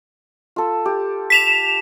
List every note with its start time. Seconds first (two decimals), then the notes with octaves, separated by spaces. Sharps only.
0.56 F4 A4
0.85 G4
1.30 B6 E7 F7